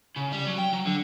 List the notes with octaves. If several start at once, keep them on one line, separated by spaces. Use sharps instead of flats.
C#3
G3
F#3
G5
F#3
D3